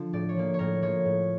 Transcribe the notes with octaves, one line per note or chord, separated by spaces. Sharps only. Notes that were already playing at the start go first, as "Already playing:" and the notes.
Already playing: D3 F3
A2 D5
C#5
F3 A#3
C#5
A2 A#4
F3 A#3 C#5
A2